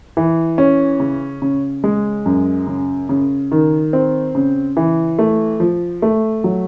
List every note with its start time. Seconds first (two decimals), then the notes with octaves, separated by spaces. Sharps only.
0.17 E3
0.58 C#4
1.00 C#3
1.42 C#3
1.84 G#3
2.26 F#2
2.67 C#3
3.09 C#3
3.52 D#3
3.93 C4
4.35 C#3
4.77 E3
5.19 A3
5.60 F3
6.02 A3
6.44 F#3